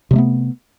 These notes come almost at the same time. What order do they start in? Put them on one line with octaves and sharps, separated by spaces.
C3 G3 A3 B3